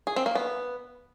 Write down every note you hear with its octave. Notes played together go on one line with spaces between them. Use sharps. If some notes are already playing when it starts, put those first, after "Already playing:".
G#4
C4
A#3
B3